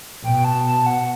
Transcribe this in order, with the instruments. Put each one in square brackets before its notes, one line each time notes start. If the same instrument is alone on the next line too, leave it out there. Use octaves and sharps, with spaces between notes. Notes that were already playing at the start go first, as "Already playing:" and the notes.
[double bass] B2 [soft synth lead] G5
[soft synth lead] A5
A5
F#5